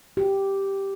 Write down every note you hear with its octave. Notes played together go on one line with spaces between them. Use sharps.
G4